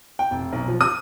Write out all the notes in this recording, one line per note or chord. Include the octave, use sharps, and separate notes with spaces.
G5
F1
B1
F3
D#6